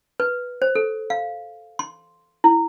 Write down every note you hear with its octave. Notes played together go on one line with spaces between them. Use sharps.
B4
C5
A4
F5
C6
E4